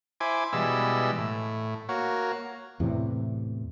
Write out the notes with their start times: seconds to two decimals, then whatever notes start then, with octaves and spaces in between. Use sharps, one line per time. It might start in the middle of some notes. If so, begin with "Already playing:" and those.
0.20 E4 C5 G#5 D6
0.53 B2 E3 G3 G#3 E6
1.18 A2
1.89 A#3 F#4 C#5
2.80 E2 A2 C3 E3